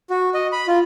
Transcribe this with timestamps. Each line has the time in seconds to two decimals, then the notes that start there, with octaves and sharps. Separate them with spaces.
0.10 F#4
0.34 D#5
0.52 B5
0.68 F4